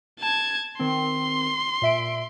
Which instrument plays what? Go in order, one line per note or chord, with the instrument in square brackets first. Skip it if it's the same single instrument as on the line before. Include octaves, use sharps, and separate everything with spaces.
[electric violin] A5 G#6
[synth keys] D#3 C4 [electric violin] C6
[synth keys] A#2 E5 D7